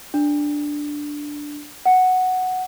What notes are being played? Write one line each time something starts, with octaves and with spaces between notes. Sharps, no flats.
D4
F#5